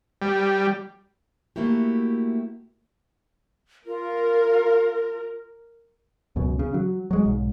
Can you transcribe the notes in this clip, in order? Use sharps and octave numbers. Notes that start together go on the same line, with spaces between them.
G3
A3 A#3 E4 F#4 G4
F4 A#4
C#2 F#2 B2
C#3
F#3
F#3 G#3
B1 G#2